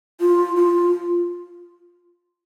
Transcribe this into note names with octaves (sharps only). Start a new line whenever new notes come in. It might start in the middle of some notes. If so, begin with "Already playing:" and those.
F4
F4